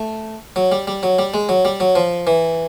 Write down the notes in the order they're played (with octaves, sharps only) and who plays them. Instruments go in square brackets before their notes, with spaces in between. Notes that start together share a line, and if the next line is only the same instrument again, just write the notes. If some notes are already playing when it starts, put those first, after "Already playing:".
Already playing: [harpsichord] A3
F#3
G3
G3
F#3
G3
G#3
F#3
G3
F#3
F3
E3